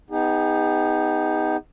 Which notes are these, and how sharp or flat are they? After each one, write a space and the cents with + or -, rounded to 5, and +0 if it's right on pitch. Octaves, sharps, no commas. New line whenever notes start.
B3 +20 D#4 +15 G#4 -40